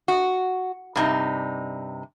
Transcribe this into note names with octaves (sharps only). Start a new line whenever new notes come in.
F#4
G2 C3 D#4